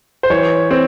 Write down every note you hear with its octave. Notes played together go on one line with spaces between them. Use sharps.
C5
E3 C#5
C4